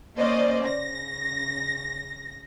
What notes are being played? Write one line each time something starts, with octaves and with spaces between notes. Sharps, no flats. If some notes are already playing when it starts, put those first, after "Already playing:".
A#3 C#4 C5 D5 D#5
C#3 A#6